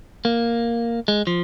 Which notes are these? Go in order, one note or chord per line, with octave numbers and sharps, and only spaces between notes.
A#3
G#3
F3